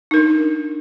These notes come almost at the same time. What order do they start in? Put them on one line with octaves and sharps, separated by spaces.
D#4 A#4 D4